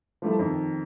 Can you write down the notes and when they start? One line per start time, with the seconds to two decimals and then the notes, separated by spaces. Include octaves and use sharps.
0.22 F3 G3 A3 A#3 E4
0.39 F2 D#3